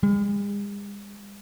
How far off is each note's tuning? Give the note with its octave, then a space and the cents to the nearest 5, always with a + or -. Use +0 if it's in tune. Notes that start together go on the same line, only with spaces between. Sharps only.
G#3 -45